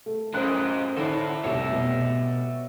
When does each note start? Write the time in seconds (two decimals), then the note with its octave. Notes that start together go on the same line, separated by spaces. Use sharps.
0.06 A3
0.34 G#2 C#4 G#4 A#4 C5 F#6
0.97 D3 C#4 E4 A4
1.44 F1 C2 G3 C#5 E5
1.72 B2